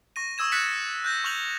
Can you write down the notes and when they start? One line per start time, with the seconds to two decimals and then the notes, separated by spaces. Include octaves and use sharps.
0.16 C#6 A#6 D#7
0.38 C#6 D#6 E6 G#6 E7
0.52 F#6 A6 B6 C#7 E7
1.04 F#6 G6 A#6
1.24 C#6 F6 G6 F7 F#7